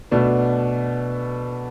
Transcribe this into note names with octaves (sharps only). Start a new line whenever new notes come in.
B2 A3 D4